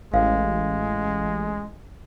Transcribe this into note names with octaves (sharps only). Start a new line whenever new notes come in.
A1 G#3 F5